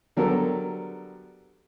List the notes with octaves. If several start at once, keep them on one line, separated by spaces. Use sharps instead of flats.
D3 F#3 G3 B3 A4 A#4